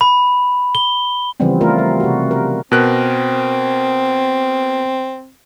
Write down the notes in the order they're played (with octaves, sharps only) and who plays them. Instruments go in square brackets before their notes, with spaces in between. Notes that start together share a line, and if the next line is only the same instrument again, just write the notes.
[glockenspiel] B5
G7
[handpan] C#3 E3 F3 G3 B3 C4
A3 F4 A#4
G3
C3 F#4
A#4
[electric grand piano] B2 A#4 F#6 [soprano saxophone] C4